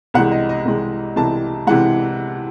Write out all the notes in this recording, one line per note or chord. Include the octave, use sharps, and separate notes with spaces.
C2 C3 E3 G#3 F#5
D#5
D#5
C2 C3 E3 G#3
C2 C3 E3 G#3 A5
C3 E3 G#3 F#5